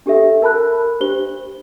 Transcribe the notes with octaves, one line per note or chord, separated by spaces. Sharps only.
D4 G4 A4 E5
A#4 A5 B5 F#6
D4 G4 C5 G7